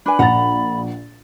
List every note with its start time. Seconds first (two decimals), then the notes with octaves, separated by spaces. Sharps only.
0.06 D4 B4 G#5 B5
0.19 A#1 F#5 A#5 A6